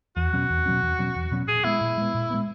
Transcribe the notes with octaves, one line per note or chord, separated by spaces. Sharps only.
E2 F#4
B2 F#3 C#4
E2
B2 F#3 C#4
E2
B2 F#3 C#4
E2
B2 F#3 C#4
A#2 G#4
G#3 B3 E4
A#2
G#3 B3
A#2
G#3 B3